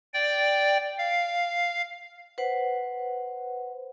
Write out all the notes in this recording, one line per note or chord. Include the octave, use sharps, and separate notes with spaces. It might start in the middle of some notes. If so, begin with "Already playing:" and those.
D5 G5
F5
B4 C5 F#5